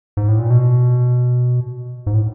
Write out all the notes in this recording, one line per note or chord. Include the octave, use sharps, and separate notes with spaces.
G#2
A2
A#2
B2
G#2
A2